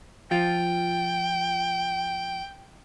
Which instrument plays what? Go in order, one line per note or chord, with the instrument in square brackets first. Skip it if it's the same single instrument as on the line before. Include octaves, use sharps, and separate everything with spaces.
[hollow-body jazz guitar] F3 F4 [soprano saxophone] G5